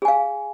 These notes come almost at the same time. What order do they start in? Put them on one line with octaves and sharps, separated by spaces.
G#4 G#5 F5